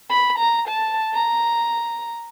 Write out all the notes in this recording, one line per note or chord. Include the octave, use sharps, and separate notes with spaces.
B5
A#5
A5
A#5